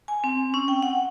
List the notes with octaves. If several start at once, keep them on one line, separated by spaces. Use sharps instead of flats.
G#5
C4
C#4
G5
F#5